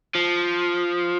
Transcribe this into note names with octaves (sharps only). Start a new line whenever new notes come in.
F3